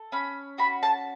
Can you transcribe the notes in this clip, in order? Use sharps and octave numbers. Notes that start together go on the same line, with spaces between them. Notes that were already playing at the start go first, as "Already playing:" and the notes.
Already playing: A4
C#4 B5
F#4 B5
A5